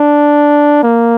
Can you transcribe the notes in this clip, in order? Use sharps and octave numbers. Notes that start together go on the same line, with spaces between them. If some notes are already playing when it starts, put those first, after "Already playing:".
Already playing: D4
A#3